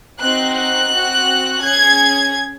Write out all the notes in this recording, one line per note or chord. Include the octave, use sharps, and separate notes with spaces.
C4 D#4 F#4 F#6
F#6
C4 F#4
C#4 G#4 G#6